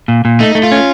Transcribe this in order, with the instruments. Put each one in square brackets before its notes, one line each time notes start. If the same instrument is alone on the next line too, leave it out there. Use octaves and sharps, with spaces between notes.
[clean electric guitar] A#2
A#2
[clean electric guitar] A3 [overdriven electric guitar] D#4
[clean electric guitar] A3
[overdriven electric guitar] F4
[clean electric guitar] C#4